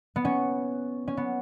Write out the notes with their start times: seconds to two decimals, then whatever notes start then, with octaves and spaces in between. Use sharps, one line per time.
0.16 B3
0.25 C#4
1.08 C#4
1.17 B3